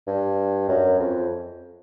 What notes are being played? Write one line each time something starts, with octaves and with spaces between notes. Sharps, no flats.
G2
F#2
F2